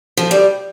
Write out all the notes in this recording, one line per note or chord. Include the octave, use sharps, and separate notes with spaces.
F3
G3